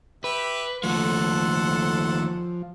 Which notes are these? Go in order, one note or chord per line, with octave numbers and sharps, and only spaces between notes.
G4 B4 E5
D#2 F3 A3 A4 F#5 C6